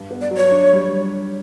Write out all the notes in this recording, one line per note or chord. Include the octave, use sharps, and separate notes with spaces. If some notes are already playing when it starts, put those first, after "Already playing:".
Already playing: G2 D4
B3
D5
F#3
C#5
D4
G3